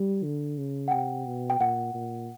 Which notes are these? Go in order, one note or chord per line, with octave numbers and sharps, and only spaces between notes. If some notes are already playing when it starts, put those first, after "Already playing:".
Already playing: G3
D3
C#3
F#5
C3 G5
B2
G5
A#2 F#5
A#2